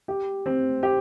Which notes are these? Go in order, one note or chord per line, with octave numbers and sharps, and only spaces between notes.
G4
C4
G4